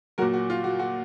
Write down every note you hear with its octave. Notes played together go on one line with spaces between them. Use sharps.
A#2 F#3 F#4 A#4
F#4
F4
F#4
F#4